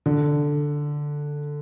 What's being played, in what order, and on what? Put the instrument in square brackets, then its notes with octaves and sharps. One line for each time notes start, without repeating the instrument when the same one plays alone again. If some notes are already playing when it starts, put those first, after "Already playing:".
[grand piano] D3